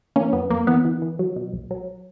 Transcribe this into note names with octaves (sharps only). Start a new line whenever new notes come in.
E3 A#3 C#4
F#2 B3
F#2 A#3
E3 B3
E3
E3
F#3
B2
B1
F#3